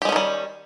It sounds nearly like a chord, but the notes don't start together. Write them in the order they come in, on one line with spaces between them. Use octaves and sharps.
G4 G#3 C#4 D#3 G3